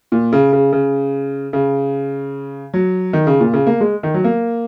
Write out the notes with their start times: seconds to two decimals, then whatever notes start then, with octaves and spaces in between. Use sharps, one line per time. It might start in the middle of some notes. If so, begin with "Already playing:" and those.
0.12 A#2
0.33 C#3
0.53 C#3
0.73 C#3
1.53 C#3
2.74 F#3
3.13 D#3
3.27 C#3
3.40 A#2
3.54 C#3
3.67 A#3
3.81 G#3
4.03 D#3
4.14 F#3
4.24 A#3